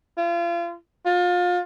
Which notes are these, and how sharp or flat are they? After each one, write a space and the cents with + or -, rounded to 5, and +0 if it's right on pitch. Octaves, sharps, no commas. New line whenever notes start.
F4 -35
F4 +30